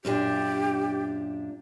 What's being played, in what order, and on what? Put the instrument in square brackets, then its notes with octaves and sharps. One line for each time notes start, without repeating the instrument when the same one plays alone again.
[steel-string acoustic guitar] F#2 A#2 D4 [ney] G4